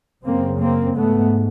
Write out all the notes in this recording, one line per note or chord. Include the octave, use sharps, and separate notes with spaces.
F#2 C#3 A#3 C4
A#3 C4
G#2 A3 B3